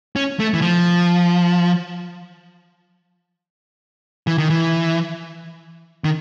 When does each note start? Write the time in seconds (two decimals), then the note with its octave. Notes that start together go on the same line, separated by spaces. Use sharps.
0.16 C#4
0.39 A3
0.54 E3
0.62 F3
4.27 E3
4.38 D#3
4.50 E3
6.05 D#3